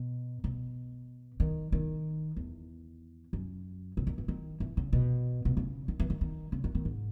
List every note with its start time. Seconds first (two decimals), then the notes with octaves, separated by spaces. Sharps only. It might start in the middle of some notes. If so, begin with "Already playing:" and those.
Already playing: B2
0.44 B2
1.40 D#3
1.72 D#3
2.37 E2
3.33 F#2
3.97 C#3
4.07 D#3
4.18 E3
4.28 D#3
4.60 E3
4.77 C#3
4.93 B2
5.45 B2
5.57 C#3
5.88 D#3
6.00 E3
6.10 D#3
6.21 D#3
6.52 C#3
6.64 D#3
6.75 D#3
6.85 G#2